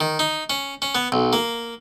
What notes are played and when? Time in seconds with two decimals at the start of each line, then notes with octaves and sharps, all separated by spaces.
0.01 D#3
0.19 D#4
0.50 C#4
0.82 C#4
0.95 B3
1.12 B1
1.33 A#3